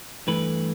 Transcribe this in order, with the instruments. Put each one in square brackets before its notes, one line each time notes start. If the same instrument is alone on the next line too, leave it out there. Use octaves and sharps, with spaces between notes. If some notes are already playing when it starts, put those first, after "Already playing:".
[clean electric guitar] G2 E3 A3 B4 B5